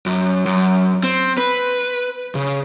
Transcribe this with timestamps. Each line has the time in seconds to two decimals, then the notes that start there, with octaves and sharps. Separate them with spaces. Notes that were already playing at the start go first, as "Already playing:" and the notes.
0.06 F#2
0.46 F#2
1.03 C4
1.38 B4
2.35 C#3